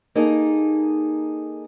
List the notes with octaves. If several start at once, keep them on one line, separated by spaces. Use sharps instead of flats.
A#3 D#4 G#4 A4